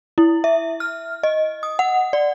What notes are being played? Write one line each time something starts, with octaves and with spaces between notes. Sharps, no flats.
E4
E5
F6
D#5
D#6
F#5
D5